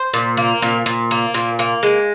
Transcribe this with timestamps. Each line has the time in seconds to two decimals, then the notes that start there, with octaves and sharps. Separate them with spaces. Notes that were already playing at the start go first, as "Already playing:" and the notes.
Already playing: C5
0.14 A#2
0.37 A#3
0.62 A#2
0.86 A#2
1.11 A#3
1.34 A#2
1.59 A#3
1.83 G#3